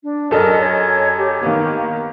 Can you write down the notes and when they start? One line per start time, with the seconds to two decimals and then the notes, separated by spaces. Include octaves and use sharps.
0.04 D4
0.31 F#2 A4 A#4 D#5
0.60 C#5
1.17 G4
1.43 D#3 A#3 B3